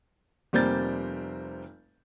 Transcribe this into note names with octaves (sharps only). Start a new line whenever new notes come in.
F1 G3 A#3 C4 G6 A6